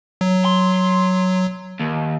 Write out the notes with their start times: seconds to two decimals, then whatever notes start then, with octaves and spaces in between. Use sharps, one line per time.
0.21 F#3
0.45 C6
1.80 D#2